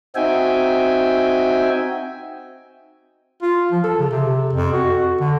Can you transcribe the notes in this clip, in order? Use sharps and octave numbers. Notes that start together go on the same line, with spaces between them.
C4 D#4 F#4 E5 G5 G#5
F4
F3
A4
C#3
C3
F2
F#4
D3